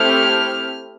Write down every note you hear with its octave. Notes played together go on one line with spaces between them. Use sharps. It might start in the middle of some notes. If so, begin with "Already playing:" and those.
Already playing: A3 C4 E4 G4 F6